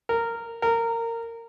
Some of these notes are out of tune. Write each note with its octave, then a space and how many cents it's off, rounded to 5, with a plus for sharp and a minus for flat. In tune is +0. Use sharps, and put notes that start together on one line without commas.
A#4 -15
A#4 -20